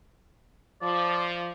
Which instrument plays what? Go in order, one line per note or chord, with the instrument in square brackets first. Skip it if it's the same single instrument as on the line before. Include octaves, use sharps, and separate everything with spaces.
[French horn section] F3 [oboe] D5